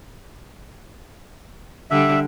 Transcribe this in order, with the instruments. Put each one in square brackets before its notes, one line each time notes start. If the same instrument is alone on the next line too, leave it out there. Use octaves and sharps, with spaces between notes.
[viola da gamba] D3 G3 [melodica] E5